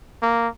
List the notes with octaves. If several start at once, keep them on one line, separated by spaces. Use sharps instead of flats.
A#3